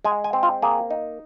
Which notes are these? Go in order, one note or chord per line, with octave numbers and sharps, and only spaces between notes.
G#3 G#5
G#5
C4
F4
A#3 G#4
D#4